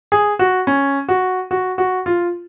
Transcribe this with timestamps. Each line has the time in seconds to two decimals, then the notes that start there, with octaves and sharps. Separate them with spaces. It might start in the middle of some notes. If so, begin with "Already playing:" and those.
0.12 G#4
0.39 F#4
0.67 C#4
1.08 F#4
1.51 F#4
1.78 F#4
2.06 F4